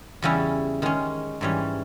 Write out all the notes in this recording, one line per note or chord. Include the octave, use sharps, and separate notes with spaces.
E2 C#3 G3 C#4 E4
D#3 G#3 C#4
G#2 E3 G3 C#4